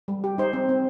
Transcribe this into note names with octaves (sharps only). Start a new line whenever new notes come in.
G3
G4
D#4 C5
C4
C4